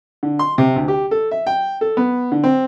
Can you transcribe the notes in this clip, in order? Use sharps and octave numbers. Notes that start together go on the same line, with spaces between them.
D3
C6
C3
D2
G4
A4
E5
G5
A4
B3
D3
C4